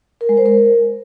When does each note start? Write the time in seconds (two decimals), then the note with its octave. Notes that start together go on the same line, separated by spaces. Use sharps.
0.21 A#4
0.29 G#3
0.37 C5
0.46 A#4